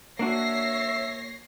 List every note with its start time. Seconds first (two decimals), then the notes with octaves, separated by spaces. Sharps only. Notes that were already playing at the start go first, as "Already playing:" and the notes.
0.19 A#3 D4 F#4 C#5 E5 A#6 C7